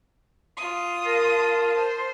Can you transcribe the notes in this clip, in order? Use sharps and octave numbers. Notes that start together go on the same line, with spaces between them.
F4 D#6
A#4 A5
C5